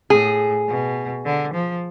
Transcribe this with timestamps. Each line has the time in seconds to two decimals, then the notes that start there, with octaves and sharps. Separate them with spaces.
0.10 A2 G#4
0.68 B2
1.25 D3
1.54 F3